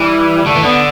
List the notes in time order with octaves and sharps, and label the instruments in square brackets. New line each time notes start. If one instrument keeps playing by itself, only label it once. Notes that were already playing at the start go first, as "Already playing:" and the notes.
Already playing: [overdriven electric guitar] E3 [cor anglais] G3
[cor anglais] G3
[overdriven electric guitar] D3 [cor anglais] A3
[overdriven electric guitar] E3
[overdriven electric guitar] D3 [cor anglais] B3